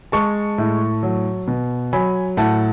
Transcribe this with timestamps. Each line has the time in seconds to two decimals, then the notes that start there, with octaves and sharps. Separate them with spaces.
0.12 G#3 A5 C#6
0.58 A2
1.03 F#3
1.48 B2
1.93 F#3 G#5 B5
2.37 A2 F#5 A5